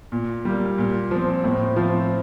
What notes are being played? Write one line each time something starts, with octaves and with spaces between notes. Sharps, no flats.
A#2
G3 A#3
A#2
F3 C4
A2
F3 C4 F4